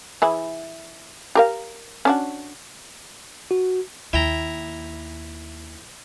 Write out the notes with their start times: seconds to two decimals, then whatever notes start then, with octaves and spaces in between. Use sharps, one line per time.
0.22 E3 E4 G#4
1.35 G4 A#4 F5
2.05 C#4 D4 F#4
3.51 F#4
4.13 D#2 E4 G5 A#5